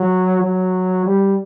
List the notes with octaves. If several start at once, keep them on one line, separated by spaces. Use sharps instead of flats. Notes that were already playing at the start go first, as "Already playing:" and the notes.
Already playing: F#3
F#3
G3